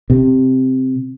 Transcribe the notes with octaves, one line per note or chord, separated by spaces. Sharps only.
C3